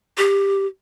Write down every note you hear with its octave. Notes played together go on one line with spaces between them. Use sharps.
G4